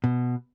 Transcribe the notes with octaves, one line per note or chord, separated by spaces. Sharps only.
B2